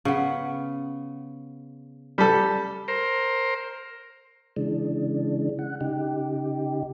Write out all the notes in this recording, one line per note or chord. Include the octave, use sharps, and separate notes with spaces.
C#3 B3
G3 A4
A#4 C5
C#3 E3 G#3 D4
F#5
C#3 D#4 G4